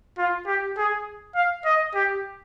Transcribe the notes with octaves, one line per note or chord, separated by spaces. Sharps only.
F4
G4
G#4
F5
D#5
G4